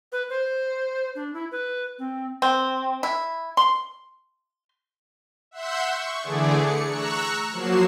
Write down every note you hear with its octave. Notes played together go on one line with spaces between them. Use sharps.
B4
C5
D4
E4
B4
C4
C4
E4
C6
E5 F#5 C6 E6 G6
C#6
D3 E3 A3 G#4 D5
C#7
A#5 C#6 E6 F#6
F3 F#3 A#3 F#4 C7 E7